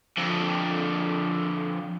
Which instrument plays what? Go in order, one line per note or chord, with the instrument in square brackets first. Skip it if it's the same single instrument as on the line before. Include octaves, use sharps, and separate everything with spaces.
[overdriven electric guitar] F2 D3